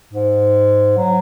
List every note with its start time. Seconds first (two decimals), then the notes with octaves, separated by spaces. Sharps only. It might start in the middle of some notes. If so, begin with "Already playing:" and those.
0.13 G#2
0.97 F#3